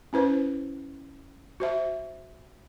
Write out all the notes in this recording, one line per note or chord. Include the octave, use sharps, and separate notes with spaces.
C#4 E4 B4 C5
F#4 C5 E5